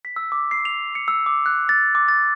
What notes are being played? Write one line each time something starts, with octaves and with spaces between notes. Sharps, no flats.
B6
E6
D6
C7
F7
C#7
E6
D6
F#6
A6
D6
A6